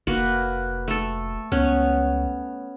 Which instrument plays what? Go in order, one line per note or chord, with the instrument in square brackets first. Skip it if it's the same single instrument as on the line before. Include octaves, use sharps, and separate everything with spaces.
[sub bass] F1 [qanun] A#3 F#4 B4
[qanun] A3 A4
[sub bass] C#2 [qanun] B3 C#4